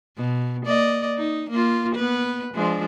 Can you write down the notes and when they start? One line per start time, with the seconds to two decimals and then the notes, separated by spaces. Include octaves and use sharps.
0.18 B2
0.66 A#3 D5 D#5
1.18 D#4
1.50 A#3 F4
1.95 B3 B4
2.54 F3 G#3 D4